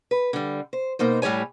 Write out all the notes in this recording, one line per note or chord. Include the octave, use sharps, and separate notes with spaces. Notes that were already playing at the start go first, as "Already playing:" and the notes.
B4
D3 G3
C5
B2 A#3 D#4 C5
A2 G3 G4 C#5 G#5